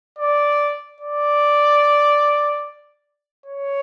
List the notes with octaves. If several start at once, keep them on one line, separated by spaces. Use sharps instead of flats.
D5
D5
C#5